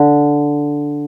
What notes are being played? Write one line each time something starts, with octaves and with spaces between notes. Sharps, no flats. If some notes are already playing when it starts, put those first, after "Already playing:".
Already playing: D3